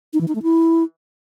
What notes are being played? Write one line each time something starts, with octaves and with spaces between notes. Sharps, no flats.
D#4
E3
D#4
A3
E4